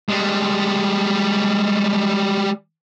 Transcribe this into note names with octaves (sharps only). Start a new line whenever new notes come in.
G3 G#3